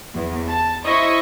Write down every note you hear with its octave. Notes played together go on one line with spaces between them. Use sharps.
E2
A5
E4 C5 D#5 E5 C#6